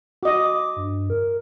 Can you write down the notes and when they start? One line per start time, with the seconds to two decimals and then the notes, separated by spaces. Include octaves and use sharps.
0.23 F#4 D#5 D6
0.76 G2
1.10 A#4